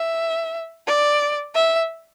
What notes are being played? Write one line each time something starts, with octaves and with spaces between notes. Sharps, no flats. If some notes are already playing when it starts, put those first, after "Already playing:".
Already playing: E5
D5
E5